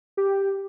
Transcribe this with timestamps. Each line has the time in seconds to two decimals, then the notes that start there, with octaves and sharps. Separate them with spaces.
0.17 G4